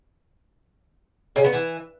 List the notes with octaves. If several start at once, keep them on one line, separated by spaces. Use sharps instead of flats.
C#3
B3
E3